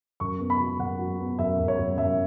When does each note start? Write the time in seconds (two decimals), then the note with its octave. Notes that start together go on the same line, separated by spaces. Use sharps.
0.20 F#2 C#6
0.40 B3
0.50 B5
0.60 F#3
0.79 F#2 F#5
0.99 F#3
1.19 B3
1.39 F#2 E5
1.59 F#2
1.68 C#5
1.78 F#2
1.98 F#2 E5